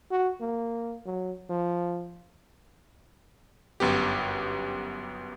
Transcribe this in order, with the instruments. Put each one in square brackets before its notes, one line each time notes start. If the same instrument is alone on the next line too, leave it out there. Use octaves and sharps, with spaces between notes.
[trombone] F#4
A#3
F#3
F3
[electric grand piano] G1 F#2 B3 G4